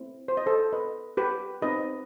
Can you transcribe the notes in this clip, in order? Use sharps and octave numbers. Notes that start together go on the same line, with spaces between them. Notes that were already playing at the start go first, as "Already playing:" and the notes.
Already playing: A3 C4 E4
C5
D#5
A4 C5
B4 D#5
G4 B4
C4 D#4 G4 B4 D#5